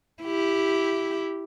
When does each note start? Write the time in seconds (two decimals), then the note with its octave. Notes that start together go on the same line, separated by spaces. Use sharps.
0.23 E4 G4